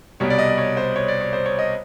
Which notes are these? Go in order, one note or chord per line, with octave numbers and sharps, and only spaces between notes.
C2 B2 G3 C#5
D5
D#5
D5
C#5
C5
C#5
D5
C#5
C5
C#5
D#5